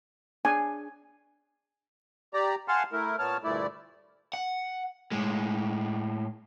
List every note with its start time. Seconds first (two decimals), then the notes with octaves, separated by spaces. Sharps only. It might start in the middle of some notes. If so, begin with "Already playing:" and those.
0.45 D4 G#4 G#5
2.34 G4 D5 A#5
2.68 F5 F#5 G#5 A5 C6 F6
2.92 A3 E4 A#4
3.19 A#2 B3 C#5 A5 F6
3.44 D2 G2 A#2 A3 E4 D5
4.34 F#5
5.12 A2 G#3